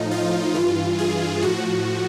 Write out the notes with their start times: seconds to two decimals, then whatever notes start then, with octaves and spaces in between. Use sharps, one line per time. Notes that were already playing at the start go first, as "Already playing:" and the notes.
Already playing: A2 F3 D#4
0.11 F4
0.55 G2 E3 F4
0.99 G#4
1.42 A2 F3 F#4